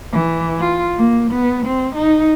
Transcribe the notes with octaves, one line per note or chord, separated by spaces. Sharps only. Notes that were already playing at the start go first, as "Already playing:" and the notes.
E3
F4
A#3
B3
C4
D#4